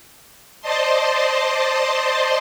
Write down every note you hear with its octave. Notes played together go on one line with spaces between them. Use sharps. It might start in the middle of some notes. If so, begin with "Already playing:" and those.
C5 D5 D#5 A5 C6